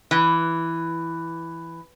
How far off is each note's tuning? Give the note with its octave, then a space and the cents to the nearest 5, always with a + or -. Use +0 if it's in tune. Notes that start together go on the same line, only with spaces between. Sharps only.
E3 +5